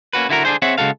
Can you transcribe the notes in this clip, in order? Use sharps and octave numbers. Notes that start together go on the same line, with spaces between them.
A#3 C#4 F#4 B4
D3 E4 F#4 A#4
D3 D4 G#4 C5
C4 G#4 C#5 E5 F#5
C#3 G#3 F#4 A4 F5